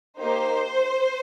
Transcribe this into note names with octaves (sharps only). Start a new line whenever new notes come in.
A#3 D#4 G4 C5